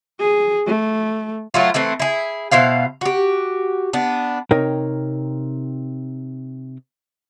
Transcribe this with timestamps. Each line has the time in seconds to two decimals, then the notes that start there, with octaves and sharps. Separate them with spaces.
0.20 G#4
0.67 A3
1.54 F#3 A3 F4
1.74 E3 A3 C4 E4
2.00 E4 G#4
2.52 B2 E4 C5 F5
3.01 F#4 G4
3.93 B3 D4
4.51 C3 D#4 A#4 C#5 G5